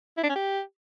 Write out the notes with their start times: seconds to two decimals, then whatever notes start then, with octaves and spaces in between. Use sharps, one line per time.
0.17 E4
0.23 D4
0.29 C#4
0.35 G4